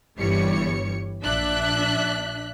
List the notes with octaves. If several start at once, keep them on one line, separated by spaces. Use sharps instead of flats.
G1 G2 E3 G3 C#5 C#7
A#1 D4 E5 F#6 B6